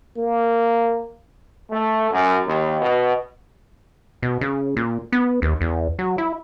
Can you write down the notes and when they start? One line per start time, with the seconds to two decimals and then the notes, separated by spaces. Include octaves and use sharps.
0.17 A#3
1.71 A3
2.12 F#2
2.46 D#2
2.81 B2
4.22 B2
4.41 C#3
4.77 A#2
5.12 B3
5.42 D#2
5.61 E2
5.99 F#3
6.18 E4